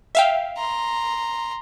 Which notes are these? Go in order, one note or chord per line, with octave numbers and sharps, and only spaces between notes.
E5 F5 G5
A#5 C6